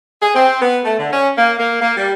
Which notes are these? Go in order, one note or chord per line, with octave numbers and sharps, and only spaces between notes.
G#4
C4
B3
A3
D3
C#4
A#3
A#3
A#3
G3